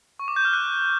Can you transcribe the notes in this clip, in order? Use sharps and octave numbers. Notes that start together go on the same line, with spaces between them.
C#6
D6
G6
F6
F#6